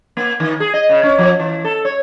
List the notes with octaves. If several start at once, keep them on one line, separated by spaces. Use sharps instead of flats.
A#3
D#3
G#4
D#5
C#3
C#4
F3
E3
A4
C#5